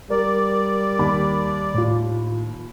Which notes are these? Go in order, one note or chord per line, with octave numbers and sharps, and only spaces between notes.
G3 A#4 D5
D#2 B5
A2 F4